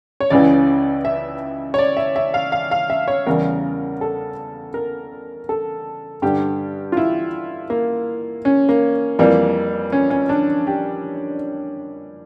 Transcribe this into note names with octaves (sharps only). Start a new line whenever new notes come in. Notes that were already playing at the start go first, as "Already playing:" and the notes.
C#5
C#2 C#3 E3 D5
E5
C#5
D5
E5
E5
F5
F5
F5
E5
C#5
E2 C#3 G3 A#4
A4
A#4
A4
G2 D3 G3 G4
F4
E4
A#3
C#4
A#3
F2 E3 G3 A#3
C#4
C#4
D4
G4